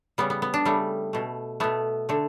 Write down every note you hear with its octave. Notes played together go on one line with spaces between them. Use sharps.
C#3 G3 B3
B3
B3
D4
C#3 G3 A3
B2 A3
B2 A3 B3
D3 A3